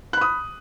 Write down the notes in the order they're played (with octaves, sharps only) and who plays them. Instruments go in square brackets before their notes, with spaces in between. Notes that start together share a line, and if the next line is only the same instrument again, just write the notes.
[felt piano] F#6
B5
D#6